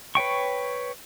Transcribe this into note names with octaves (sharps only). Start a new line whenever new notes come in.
B4 C#5 G5 C#6